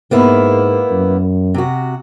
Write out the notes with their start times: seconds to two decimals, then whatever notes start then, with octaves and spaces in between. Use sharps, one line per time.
0.11 G#2 A#3 B3 E4
0.92 F#2
1.54 C3 F#4